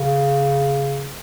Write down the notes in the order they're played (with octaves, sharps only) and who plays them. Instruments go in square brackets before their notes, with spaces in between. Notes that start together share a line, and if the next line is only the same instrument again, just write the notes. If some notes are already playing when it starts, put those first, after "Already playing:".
Already playing: [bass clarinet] C#3